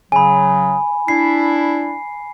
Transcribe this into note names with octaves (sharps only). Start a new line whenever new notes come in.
C#3 F#3 G#5 B5
D4 E4 C7